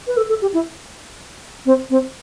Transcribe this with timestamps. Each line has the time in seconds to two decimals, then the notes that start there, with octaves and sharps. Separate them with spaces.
0.07 B4
0.17 A4
0.29 A4
0.42 G4
0.54 E4
1.66 C4
1.90 C4